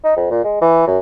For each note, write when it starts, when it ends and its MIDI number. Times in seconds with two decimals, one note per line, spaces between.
0.04 0.14 63
0.17 0.31 41
0.31 0.44 46
0.44 0.60 56
0.61 0.87 52
0.87 0.99 42